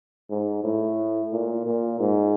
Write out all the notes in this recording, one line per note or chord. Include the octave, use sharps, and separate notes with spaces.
G#2
A2
A#2
A#2
G#2